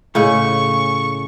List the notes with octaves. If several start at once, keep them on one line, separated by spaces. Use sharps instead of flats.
A2 C#3 G#3 C#6